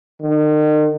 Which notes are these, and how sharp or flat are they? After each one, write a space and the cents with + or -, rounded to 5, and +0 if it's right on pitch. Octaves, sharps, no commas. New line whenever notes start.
D#3 -40